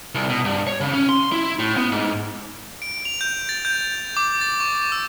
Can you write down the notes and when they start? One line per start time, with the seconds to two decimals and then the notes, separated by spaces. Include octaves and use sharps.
0.15 C2
0.29 B2
0.45 G2
0.67 C#5
0.81 C#3
0.93 C#4
1.09 C6
1.32 E4
1.59 A2
1.77 B3
1.92 G#2
2.82 D7
3.05 F7
3.21 G6
3.49 A6
3.65 G6
4.17 D6
4.41 A6
4.60 C#6
4.92 E6